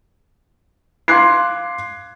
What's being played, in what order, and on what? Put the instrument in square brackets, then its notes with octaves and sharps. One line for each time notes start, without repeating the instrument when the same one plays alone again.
[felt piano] F5 C6 D6 F#6 G#6 C7